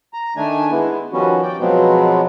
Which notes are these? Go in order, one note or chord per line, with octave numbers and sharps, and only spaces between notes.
A#5
D#3 A3 D4 G#5
G#3 B3 E4
D#3 F3 G3 B3 C#4 F#4
D5 G5
B2 F3 F#3 G#3 B3 C4